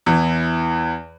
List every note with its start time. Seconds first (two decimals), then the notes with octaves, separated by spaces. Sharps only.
0.06 E2 E3